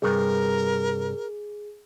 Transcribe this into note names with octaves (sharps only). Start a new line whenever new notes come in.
C2 G2 G#4 A#4